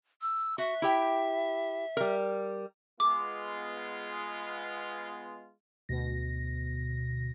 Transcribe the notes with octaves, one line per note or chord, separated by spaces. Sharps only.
E6
F#4 E5
E4 G4 G5
G3 A#4
G#3 B3 F4 D6
D2 B2 A#6